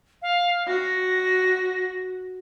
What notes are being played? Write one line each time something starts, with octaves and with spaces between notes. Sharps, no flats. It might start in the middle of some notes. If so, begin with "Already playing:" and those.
F5
F#4 A#6